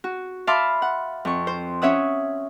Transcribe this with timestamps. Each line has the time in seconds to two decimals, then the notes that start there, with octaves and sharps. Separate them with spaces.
0.04 F#4
0.47 E5 F5 A5 B5 C6 D6
0.82 F#5
1.25 F2 C#6
1.47 C5
1.82 C#4 C#5 E5 F#5 D#6